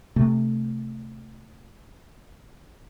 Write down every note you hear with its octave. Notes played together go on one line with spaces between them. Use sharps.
C3 A3